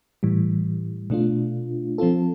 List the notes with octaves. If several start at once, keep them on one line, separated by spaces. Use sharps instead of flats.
A2 E3 G3
B2 A3 D4 F4
F3 C4 F4 A4